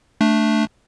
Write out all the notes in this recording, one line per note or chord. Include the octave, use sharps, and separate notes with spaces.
A3 D4